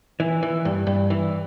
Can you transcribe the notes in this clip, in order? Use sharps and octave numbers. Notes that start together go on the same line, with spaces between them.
E3
E3
G2
G2
E3